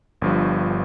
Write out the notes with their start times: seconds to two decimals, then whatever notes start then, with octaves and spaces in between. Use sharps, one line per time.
0.22 G1 G2 F3